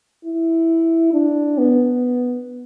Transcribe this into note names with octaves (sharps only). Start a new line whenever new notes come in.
E4
D4
B3